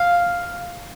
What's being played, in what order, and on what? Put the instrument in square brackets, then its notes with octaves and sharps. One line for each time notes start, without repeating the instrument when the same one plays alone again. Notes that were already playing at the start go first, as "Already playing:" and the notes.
Already playing: [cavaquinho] F5